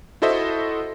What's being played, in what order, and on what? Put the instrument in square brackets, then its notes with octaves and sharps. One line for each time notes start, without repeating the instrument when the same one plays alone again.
[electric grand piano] E4 F#4 A4 C5 D#5 E5